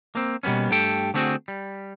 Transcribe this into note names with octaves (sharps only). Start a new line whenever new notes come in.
A#3 C4
B2 G3 A#3 B3 C#4
G2 A3 G4 A4 G5
D3 A3 B3 C4 F#4 G#4
G3